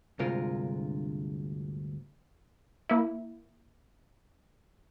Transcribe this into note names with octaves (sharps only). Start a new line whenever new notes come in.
D2 G2 C3 G#3 F4 A#4
A#3 E4